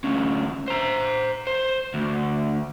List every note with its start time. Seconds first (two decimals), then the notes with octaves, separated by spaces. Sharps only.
0.04 D2 C#4
0.68 C5 A#5
1.47 C5
1.94 D2